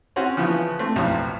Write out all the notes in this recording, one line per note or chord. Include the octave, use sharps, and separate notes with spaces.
C4 C#4 F#4
C#3 E3 F3 B3
A3 C4
B1 F2 A2 F#3